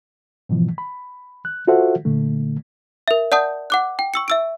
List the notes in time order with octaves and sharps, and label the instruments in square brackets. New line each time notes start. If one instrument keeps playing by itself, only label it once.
[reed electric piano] G#2 B2 E3 F3
B5
F#6
F4 F#4 A4 C5 E5 F#5
A#2 D3 A3
[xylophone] A#4 E5
D5 F#5 A5 D#6 G6
F#5 D6 F#6
G5
C#6 E6 C#7
E5 E6 D7